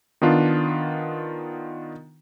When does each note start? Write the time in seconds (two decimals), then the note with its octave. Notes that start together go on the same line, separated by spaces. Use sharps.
0.22 D#3 B3 D4 F4